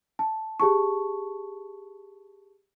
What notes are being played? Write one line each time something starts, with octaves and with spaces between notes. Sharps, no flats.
A5
G4 G#4 A5 C#6